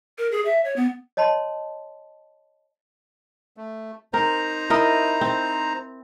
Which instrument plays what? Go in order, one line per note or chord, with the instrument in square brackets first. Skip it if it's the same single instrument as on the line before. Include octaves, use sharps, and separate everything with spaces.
[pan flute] A#4
G#4
E5
C#5
B3
[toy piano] C#5 D#5 A5 B5 C6
[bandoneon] A3
[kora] C4 A#4 [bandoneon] D#4 C5 A#5
[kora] E4 A#4 D#5
C4